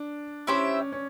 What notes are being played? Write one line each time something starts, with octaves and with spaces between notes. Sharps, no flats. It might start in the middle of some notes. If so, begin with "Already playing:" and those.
Already playing: D4
C#4 E4 G4 C5 E5
C#4